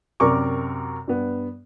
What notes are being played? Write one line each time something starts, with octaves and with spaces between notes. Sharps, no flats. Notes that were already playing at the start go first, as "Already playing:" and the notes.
F#2 C3 A#4 D5 C#6 D6
G2 B3